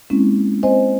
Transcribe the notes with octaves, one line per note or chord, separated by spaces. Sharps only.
G#3 A#3 C4 C#4 E4
C4 C5 D#5 G#5